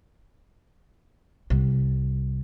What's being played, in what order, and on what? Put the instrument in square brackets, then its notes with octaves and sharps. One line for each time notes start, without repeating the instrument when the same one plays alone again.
[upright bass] C2